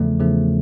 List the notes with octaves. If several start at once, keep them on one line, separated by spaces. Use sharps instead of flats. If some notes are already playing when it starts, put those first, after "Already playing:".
Already playing: E2 C#3 F3 A3
E2 C#3 F3 A3